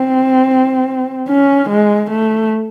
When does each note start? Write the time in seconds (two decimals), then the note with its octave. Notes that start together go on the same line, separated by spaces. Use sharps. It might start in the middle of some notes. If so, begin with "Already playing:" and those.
Already playing: C4
1.28 C#4
1.69 G#3
2.11 A3